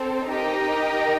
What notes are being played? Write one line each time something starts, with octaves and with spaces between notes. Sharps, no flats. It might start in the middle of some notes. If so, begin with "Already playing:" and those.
Already playing: C4 A4 C5
D#4 G4 A#4 D#5 G5